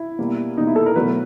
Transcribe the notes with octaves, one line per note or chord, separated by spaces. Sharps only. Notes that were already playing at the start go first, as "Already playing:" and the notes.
Already playing: E4
B2 G3 A#3
B2 G3 A#3 D#4
E4
A4
A#4
B2 F#3 A3 B4